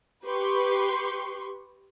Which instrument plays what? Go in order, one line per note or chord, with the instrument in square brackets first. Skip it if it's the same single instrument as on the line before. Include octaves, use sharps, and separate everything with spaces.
[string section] G4 B4 C6 C#6